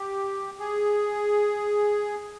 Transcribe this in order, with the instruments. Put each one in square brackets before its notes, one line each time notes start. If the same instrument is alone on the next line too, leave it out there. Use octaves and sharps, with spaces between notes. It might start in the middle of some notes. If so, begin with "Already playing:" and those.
Already playing: [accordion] G4
G#4